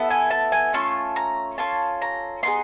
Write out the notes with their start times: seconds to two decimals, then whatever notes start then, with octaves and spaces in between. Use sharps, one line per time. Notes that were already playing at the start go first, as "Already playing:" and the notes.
Already playing: B3 E4 A4
0.10 G#5
0.30 A5
0.52 G#5
0.73 A3 C#4 F4 A5
1.16 A#5
1.58 C#4 F4 A4 A5
2.02 A#5
2.43 B3 D#4 G#4 C6